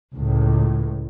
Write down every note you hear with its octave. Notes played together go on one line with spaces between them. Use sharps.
C#2 A2